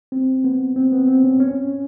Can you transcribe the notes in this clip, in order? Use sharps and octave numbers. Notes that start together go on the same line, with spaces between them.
C4
B3
C4
B3
C4
C#4
C#4